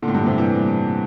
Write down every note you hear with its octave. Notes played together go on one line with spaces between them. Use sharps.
A#2 D3
A2
G2 A#2
A2 C3
E3 G3